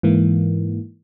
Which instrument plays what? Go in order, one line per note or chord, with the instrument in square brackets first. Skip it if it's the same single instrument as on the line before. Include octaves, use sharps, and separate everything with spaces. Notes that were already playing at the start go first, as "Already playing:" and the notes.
[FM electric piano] G#2 E3 A#3